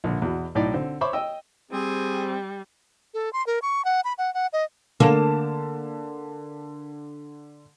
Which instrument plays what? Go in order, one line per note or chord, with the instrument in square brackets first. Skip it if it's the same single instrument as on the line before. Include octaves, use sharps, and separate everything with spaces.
[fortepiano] A#1 D3
E2 B2
B1 A2 D#4 D5
D3 C4
C5 C#5 E5 B5 C#6 D6
D#5 G5 E6
[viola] G3 [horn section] C4 [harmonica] G#4
[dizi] A4
C6
A#4
C#6
F#5
B5
F#5
F#5
D#5
[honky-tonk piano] D3 A5 E7 [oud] A#3